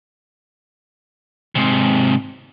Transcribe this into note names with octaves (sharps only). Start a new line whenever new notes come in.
G#2 C3